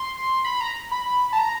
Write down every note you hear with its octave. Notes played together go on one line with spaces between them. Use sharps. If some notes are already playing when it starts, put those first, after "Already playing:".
Already playing: C6
B5
A#5
B5
A5
A#5